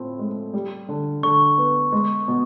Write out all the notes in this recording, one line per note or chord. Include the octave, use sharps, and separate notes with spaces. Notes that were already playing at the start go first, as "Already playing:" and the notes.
Already playing: A2 F3 C4
G#3
G3
D3
D3 C#6
B3
G#3
B2